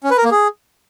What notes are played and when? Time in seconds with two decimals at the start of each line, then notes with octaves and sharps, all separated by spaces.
0.04 C#4
0.10 B4
0.17 A#4
0.24 A#3
0.31 G#4